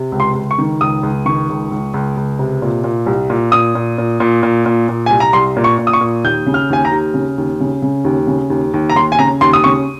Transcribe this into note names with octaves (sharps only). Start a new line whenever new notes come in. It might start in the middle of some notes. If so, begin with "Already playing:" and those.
Already playing: C3
C#2
C6
C#2
C#6
D#3
C#2 D#6
C#2
D#3 C#6
C#2
C#2
C#2
C#2
C3
A#2
A#2
C2
A#2
A#2 D#6
A#2
A#2
A#2
A#2
A#2
A#2
C2 G#5
A#5
C2 C6
A#2
C#6
A#2
D#6
C#6
A#2
D#2 G6
C#3
F6
D#2 G#5
A#5
D#2
C#3
D#2
C#3
C#3
D#2
C#3
D#2
D#2
A#5
D#2 C6
G#5
C#3 A#5
D#2 C6
D#6
C#3 C#6